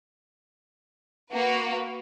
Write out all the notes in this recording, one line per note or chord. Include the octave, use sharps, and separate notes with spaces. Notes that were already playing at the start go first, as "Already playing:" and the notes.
A#3 F#4 B4